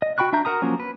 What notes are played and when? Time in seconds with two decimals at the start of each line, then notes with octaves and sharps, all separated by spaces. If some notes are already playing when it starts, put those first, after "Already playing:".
0.02 D#5
0.18 F#4 G5 B5 C#6 F#6
0.33 D4 E5 A#5 G6
0.45 F#4 A#4 A#5 D#6
0.62 F3 F#3 A#3 C#4
0.80 B4